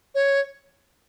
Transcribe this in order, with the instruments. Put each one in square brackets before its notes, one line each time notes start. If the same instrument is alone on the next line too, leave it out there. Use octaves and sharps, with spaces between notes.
[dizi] C#5